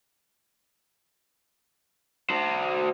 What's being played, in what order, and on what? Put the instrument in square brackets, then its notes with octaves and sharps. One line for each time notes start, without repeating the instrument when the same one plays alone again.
[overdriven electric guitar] F#4 C5